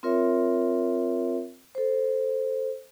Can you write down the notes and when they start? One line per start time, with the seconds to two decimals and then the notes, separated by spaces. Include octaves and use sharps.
0.03 C4 F4 A#4 C#5 E5
1.75 A4 C5